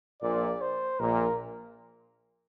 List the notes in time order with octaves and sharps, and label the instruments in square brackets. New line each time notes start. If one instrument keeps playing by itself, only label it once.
[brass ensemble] A#1 A#2 [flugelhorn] D5
[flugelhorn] C5
[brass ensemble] A#1 A#2 [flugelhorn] A#4